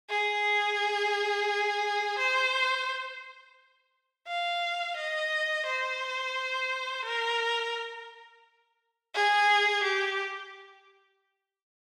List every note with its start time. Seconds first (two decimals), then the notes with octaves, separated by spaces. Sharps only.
0.10 G#4
2.19 C5
4.27 F5
4.97 D#5
5.66 C5
7.05 A#4
9.14 G#4
9.84 G4